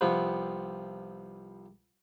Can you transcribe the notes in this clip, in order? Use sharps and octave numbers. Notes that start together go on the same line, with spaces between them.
C2 C3 F3 B3